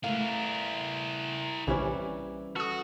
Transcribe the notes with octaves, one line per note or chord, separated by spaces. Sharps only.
A3 B3 E4 A#4 F5
A#1 C3 E3 G3 C#4 E4 C5 D5
F#4 A4 D#6